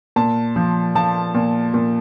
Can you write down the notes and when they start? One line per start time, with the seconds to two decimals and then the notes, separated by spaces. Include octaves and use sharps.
0.16 A#2 A5
0.56 F3
0.95 F3 A5
1.35 A#2
1.74 A#2